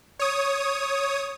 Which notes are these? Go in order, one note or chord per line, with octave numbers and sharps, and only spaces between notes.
C#5 D#6